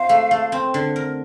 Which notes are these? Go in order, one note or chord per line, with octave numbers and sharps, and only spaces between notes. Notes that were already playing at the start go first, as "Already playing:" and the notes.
Already playing: F2 C5 F5
A3
A3
C4
D3
A#4